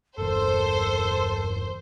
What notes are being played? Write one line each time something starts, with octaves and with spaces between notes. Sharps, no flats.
G1 E2 A4 A#4 C5